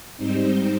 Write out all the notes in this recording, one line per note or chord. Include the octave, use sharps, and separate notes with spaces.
G#2 G3 C4 D#4 C5